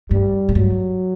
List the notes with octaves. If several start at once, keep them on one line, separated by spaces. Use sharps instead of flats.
G2 G3
A2
G2 F#3